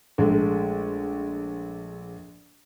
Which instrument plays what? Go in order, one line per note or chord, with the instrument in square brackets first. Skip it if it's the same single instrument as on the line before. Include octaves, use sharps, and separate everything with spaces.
[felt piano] A#1 G#3 A3